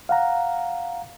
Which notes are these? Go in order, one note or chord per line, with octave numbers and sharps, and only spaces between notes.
F5 F#5 A#5